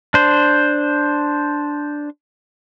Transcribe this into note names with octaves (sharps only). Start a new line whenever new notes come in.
D4 C5